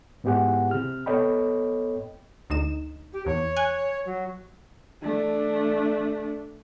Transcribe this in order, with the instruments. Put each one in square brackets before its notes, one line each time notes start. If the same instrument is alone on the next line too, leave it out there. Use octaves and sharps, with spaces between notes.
[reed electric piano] G#2 B3 E4 G4 G#4 F#5
C3 F6
B3 A4 C#5 D#5 G5 B5
[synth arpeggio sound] D2 D#4 E7
[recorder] G4
[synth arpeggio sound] E2 [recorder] C#5
[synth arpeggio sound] G#5 F#6 G#6
[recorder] F#3
[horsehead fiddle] A3 D4